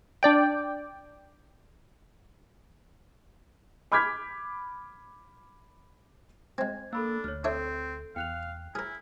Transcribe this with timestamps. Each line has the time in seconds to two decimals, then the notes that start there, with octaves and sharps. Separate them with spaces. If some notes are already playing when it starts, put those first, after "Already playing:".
0.23 D4 D5 G5
3.92 B5 D6 F6 G6 G#6 B6
6.58 G#3 C4 G#6
6.93 A#3 D4 A4 B5 E6
7.24 D2 C#5 F6
7.44 C4 D4 A4 C#5 E5
8.16 E2 F5 G5 F#6 F7
8.75 E4 G#4 A#4 F6